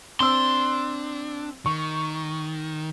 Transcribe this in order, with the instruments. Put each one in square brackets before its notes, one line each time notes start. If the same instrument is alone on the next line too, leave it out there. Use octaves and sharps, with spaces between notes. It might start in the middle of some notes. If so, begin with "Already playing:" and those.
[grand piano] C4 E6 [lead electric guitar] D4 [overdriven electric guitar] C6
[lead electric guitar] D#3 [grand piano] C#6